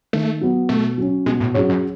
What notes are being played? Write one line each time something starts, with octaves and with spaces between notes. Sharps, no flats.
D#3 A3
F#3 B3
B2 A3
F#3 C#4
B2 G#3
A2
G#2 F#3 C#4 G#4 C#5
F#2